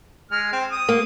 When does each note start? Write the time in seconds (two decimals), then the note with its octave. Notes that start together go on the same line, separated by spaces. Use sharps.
0.31 G#3 F6
0.53 C4
0.72 D#6
0.89 A#3